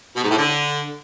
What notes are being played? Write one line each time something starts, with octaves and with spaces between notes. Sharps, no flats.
B2
G#2
A2
D3